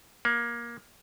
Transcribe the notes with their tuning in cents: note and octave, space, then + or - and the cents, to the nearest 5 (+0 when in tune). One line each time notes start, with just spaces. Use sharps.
A#3 +20